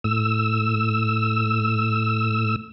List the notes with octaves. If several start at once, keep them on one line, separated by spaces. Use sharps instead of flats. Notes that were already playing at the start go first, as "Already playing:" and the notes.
A2 E6